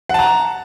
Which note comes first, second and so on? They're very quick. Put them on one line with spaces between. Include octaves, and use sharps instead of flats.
F#5 A5 A#5